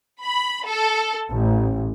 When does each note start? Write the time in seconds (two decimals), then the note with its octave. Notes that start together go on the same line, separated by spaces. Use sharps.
0.23 B5
0.66 A4
1.28 A1